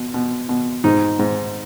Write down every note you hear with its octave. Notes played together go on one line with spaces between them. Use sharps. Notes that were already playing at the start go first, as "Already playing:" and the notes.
Already playing: B2
B2
B2
G#2 D#4
G#2